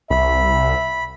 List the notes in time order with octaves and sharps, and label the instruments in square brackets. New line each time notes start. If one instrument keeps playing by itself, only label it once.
[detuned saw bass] C2 [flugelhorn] E5 [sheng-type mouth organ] B5